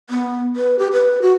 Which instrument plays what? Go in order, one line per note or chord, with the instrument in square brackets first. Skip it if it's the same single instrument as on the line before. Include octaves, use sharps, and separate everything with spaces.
[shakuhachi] B3
B4
G4
B4
F#4